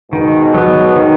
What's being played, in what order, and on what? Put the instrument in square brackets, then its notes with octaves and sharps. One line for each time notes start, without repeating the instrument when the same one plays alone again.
[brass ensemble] G#2 B2 [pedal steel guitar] D#3
[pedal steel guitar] F#3 B3
D#3